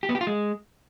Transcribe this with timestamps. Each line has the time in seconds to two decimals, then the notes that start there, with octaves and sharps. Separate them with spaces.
0.03 G4
0.09 B3
0.15 G4
0.21 F4
0.27 G#3